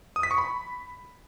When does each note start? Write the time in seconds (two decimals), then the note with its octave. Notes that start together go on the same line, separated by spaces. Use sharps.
0.16 D#6
0.23 B6
0.31 C#6
0.38 B5